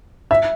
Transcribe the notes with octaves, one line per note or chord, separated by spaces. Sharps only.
E5